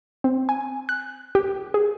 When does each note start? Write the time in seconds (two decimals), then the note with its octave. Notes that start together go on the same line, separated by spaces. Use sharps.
0.24 C4
0.49 G#5
0.89 F#6
1.35 G4
1.74 G#4